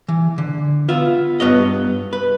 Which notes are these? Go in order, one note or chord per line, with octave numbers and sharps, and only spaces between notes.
E3
D3
B3 F4 E5
G2 B3 C#5 D#5
B4